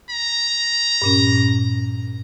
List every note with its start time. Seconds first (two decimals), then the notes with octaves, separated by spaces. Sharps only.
0.10 A#5
1.02 G2 A#2 C#4